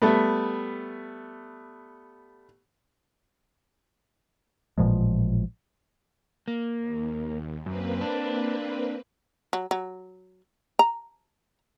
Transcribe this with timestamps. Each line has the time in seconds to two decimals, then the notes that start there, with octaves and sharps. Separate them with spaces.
0.02 G3 A3 B3
4.78 A1 A#2 F3 G#3
6.48 A#3
6.79 D#2
7.66 F#2 A#3 C4 B4
8.01 D4
9.53 F#3
9.71 F#3
10.79 A#5